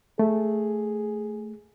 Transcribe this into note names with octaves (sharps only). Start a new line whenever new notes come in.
A3 G#4